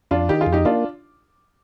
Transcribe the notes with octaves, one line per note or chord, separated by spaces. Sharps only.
F2 D4 F4
D#3 D#4 G4
F4 G#4
F2
D#4 G4
A#3 D4 F4